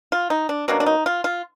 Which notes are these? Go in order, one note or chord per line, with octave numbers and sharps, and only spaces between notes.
F4
D#4
D4
B2 F#3 A#3 C#4 D4
D4
D#4
F4
F4